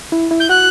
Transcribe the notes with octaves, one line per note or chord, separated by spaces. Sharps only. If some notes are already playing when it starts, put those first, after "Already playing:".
E4
E4
G6
F#4 F#6